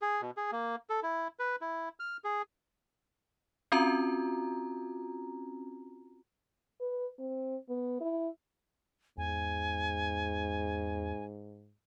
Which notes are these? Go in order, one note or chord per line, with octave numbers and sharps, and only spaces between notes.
G#4
B2
G#4
A#3
A4
E4
B4
E4
F6
G#4
C4 C#4 F4 F#4 A#5
B4
C4
B3
E4
E2 G#2 G#5